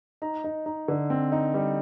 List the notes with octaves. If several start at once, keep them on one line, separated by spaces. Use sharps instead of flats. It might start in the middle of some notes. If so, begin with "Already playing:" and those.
D#4 A#5
D#4
D#4
D3
C4
D#4
G3